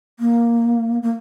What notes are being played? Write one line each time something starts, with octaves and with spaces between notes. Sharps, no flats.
A#3
A#3